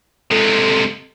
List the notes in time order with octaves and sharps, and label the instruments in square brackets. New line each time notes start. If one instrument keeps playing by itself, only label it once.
[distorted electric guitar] C3 G#3 [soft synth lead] A4